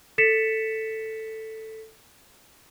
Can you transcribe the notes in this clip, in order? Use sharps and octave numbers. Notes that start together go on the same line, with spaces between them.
A4 A6 B6 C#7 E7